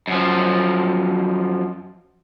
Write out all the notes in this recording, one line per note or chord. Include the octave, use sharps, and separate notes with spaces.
F#2 F3